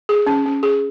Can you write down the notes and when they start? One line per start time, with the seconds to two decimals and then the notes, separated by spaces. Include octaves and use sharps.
0.09 G#4
0.26 C#4
0.46 C#4
0.63 G#4